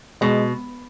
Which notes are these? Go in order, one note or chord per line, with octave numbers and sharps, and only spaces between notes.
B2 G#3